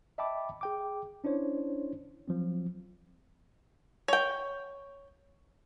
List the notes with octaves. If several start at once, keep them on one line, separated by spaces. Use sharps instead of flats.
D#5 E5 G5 A5 B5 D6
G#4 G5 D6
C#4 D4 E4 C5 C#5
F3 F#3 C4
C#5 G5